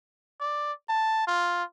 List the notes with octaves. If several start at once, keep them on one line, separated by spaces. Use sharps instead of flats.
D5
A5
F4